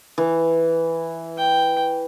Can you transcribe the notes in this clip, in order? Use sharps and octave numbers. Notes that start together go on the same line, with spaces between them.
E3
G5